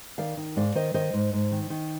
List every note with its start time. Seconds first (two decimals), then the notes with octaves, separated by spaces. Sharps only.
0.18 D#3 D5 F5
0.37 D#3
0.56 G#2 D5 F5
0.75 D#3 C5 D#5
0.94 D#3 C5 D#5
1.14 G#2
1.33 G#2
1.52 D#3
1.70 D#3